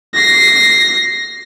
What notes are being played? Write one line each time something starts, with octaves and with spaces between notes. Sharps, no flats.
A#6 C7